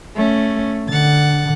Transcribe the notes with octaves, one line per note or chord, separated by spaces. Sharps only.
A3 C#4
D3 F#5 A6